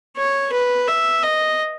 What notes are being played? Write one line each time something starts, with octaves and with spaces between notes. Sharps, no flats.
C#5
B4
E5
D#5